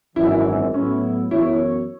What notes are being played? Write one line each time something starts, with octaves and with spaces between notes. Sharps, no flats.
G#1 F#2 E3 E4
A2 F#3 B3 C#4 E4
F#2 E3 B3 E4 F#4 C#5